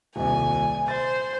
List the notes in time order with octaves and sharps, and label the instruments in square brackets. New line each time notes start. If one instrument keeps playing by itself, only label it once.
[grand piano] D#1 C2 [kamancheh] G#5
[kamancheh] C5 [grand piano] A6